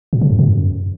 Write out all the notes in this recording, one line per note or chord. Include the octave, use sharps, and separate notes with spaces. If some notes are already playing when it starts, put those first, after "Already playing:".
A#2
C#3
F#2
B2
F#2